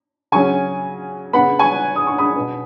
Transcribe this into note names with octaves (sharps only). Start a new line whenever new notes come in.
C#3 F#3 C#4 G#5 C#6
C#3 B3 F#5 B5
G#5 C#6
D#6
C#6
B5 D#6
B2 B3